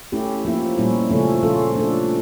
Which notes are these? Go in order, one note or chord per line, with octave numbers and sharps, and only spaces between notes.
A3 C#4 E4 G4
F3 A#3 E4
A#2 G3 C#4 E4
C#3 F3 A3 C#4
F3 C#4 F4 A4
A3 D4 A4